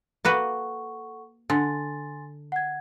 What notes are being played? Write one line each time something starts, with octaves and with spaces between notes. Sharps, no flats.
A#3 F#4 A4 B4 F#5 C#6
D3 G#5 C6 A6
F#5 G#6